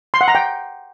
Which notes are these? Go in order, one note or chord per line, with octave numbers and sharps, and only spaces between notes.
C6
F#5
A#5
G5